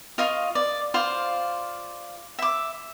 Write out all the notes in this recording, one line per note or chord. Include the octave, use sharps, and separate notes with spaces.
F4 D#5 F5 C#6
D5
F4 C5 D5 F5
E5 D6